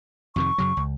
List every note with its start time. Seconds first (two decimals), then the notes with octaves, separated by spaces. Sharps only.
0.36 F2 C3 D#3 C#6
0.58 F#2 C#3 F#3
0.77 C#2